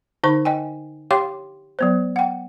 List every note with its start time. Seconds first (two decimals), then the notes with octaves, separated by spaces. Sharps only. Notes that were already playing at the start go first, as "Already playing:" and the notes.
0.23 D3 D#4 C5 C#6
0.45 D#5 G5 G#5
1.11 G4 C#5 F5 G5 C6 D6
1.79 F#3 B3 C5
2.16 F#5 G5